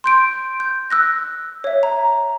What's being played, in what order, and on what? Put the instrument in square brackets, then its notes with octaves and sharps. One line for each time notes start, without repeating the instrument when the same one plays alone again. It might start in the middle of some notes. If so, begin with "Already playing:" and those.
[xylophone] C6 G6 D7
G6
E6 F#6 A#6
C#5 E5
A#5